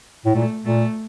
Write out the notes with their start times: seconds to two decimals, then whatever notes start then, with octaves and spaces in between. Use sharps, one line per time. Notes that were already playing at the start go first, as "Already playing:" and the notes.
0.26 A2
0.35 A#2 A3
0.65 A#2 A3